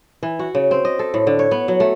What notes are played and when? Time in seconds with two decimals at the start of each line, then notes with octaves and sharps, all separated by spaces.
0.23 E3
0.39 F#4
0.55 C#3
0.71 C4
0.85 D#5
0.99 A4
1.14 A2
1.27 D3
1.39 C#5
1.51 B3
1.68 F#3
1.80 A3